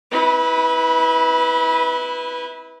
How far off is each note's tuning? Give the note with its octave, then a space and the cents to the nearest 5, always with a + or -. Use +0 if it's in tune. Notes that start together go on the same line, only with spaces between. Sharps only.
E4 -30 B4 +0